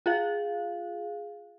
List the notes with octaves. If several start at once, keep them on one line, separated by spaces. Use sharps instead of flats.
F4 G#4 F5